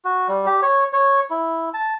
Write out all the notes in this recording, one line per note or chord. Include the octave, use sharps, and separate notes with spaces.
F#4
G3
G4
C#5
C#5
E4
A5